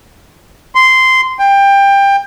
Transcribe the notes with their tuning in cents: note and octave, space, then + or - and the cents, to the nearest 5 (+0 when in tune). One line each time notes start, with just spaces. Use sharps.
C6 -10
G5 +20